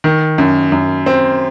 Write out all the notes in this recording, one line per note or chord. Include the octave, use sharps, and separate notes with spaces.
D#3
F#2
F#2
C4